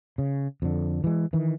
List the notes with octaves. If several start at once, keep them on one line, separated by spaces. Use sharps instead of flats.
C#3
F2 D3
E3 G#3
D#3 E3